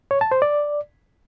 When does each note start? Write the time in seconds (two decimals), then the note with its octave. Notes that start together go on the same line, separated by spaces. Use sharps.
0.11 C#5
0.21 A5
0.32 C5
0.42 D5